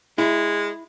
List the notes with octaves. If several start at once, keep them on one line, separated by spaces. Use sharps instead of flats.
G#3 E4